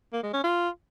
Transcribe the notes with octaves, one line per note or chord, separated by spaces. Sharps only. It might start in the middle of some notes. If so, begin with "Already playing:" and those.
A#3
G#3
C#4
F4